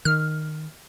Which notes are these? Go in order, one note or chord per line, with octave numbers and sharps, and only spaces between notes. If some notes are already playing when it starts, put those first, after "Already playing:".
D#3 F6